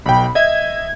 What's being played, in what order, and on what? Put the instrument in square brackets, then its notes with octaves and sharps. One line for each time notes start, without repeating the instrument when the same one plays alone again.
[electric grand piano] B1 G5 [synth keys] B2 B5
[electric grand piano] D#5 E5 [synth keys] G#6